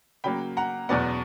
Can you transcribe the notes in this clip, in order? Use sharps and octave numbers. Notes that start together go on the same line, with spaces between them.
C#3 F#3 A#3 G5 B5
F#5 A#5
E2 B2 F#3 B3 D5 F#5